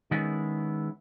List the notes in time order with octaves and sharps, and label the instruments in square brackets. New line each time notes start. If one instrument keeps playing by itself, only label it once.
[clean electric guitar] D#3 G#3 B3 C#4 E4 G#4